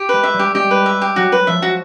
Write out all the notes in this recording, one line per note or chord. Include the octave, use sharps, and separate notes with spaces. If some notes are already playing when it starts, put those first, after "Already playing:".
Already playing: G4
G#3 B4
E5
G3
G4
G#3 G4
B4
E5
G4
F#3 F#4
B4
F3 E5
F#4